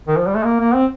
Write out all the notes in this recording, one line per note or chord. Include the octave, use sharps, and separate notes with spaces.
D#3
F3
G3
A3
A#3
A#3
C4